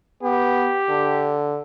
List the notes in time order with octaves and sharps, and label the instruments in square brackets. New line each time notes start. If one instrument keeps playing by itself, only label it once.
[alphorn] B3 [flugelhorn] G4
[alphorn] D3